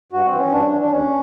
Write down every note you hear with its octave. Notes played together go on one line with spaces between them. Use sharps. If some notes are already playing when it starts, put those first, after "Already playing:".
G2 F#4
C4
E3
C#4
G2 D4
E3
D4
D#2 C#4